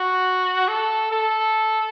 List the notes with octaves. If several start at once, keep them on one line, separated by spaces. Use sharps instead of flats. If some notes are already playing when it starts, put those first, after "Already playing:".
Already playing: F#4
A4
A4